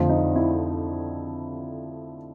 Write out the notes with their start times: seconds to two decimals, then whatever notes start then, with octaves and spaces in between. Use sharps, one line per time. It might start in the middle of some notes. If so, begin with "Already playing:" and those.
Already playing: F2 D3 F3 A3
0.09 D#4
0.36 E4